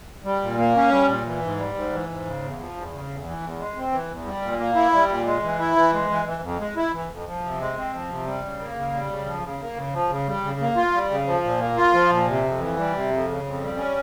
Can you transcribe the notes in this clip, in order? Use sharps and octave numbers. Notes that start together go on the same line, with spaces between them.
G3
A#2
A#3
C#4
G3
A#2
E3
G#2
G3
G#2
E3
G#2
C#3
E2
F3
E2
C#3
E2
E3
E2
G#3
C4
E3
E2
G3
A#2
A#3
E4
G3
A#2
G#3
E3
E4
E3
G#3
E3
E3
F2
G#3
E4
E3
F2
F3
C3
G#3
C4
F3
C3
G3
C#3
A#3
C#3
G3
C#3
F3
C#3
A#3
C#3
F3
C#3
G3
C#3
A#3
F4
G3
C#3
F3
A#2
A#3
F4
F3
A#2
C3
F2
E3
G3
C3
F2
C#3
F2
G3
C#4